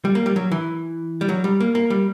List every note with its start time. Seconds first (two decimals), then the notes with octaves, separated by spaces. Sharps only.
0.05 G3
0.15 A#3
0.26 G3
0.36 F#3
0.52 E3
1.21 G3
1.29 F#3
1.44 G3
1.60 A#3
1.75 A#3
1.90 G3